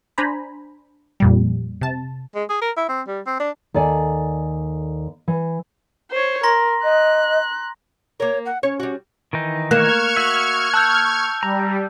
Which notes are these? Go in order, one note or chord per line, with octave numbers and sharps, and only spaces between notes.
D4 C5 G#5 A#5 B5
F2 A#2 G3
C3 A5
G#3
G#4
A#4
E4
C4
G3
C4
D4
D#2 A4 D5 G#5
E3
C5 C#5
A#4 A#5 C6 A#6
D#5 F#6
A#3 A#4 C#5
F#5
C#4 C#5
G3 F#4
D#3 E3 D#4
A#3 C#6 F6 F#6 G#6 E7
F#4 E5
A5 E6 F#6 G6
G3 A#5